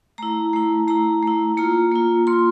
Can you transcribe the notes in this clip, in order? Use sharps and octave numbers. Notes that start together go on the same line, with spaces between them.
A3 E4 A#5
A3 E4
A3 E4 A#5
A3 E4
A#3 F4 A#5
A#3 F4
A#3 F4 C6